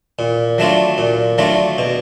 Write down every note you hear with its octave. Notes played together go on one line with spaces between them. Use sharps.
A#2
F#3 A3 D4 F4
A#2
F#3 A3 D4 F4
B2